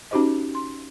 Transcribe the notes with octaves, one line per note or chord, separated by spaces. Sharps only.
C#4 D#4 F#4 G4 C5 D#5
C6